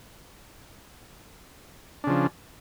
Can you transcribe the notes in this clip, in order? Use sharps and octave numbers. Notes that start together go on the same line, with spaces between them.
C#3 F3 D4